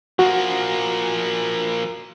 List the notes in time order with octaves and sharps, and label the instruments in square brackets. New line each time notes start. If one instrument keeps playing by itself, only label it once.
[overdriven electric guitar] F3 A#3 [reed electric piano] F#4